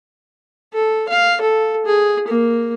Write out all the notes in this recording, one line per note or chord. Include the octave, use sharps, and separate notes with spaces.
A4
F5
A4
G#4
A#3